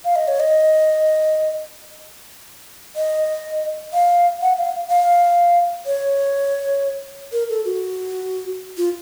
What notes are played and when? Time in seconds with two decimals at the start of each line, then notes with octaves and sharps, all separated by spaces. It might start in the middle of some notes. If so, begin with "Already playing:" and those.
0.05 F5
0.16 D#5
0.28 C#5
0.40 D#5
2.96 D#5
3.93 F5
4.42 F#5
4.58 F5
4.90 F5
5.86 C#5
7.32 A#4
7.49 A4
7.65 F#4
8.77 F4